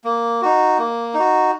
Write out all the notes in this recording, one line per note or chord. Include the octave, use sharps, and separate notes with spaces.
A#3
D#4 F#4
A#3
D#4
F#4